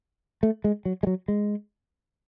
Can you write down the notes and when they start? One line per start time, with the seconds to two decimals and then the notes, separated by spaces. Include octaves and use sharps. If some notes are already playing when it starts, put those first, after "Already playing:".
0.43 A3
0.64 G#3
0.85 F#3
1.03 G#3
1.07 F#3
1.28 G#3